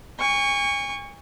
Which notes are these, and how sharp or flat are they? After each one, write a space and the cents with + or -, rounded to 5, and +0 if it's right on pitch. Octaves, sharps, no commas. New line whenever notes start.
G#5 -40 C#6 +10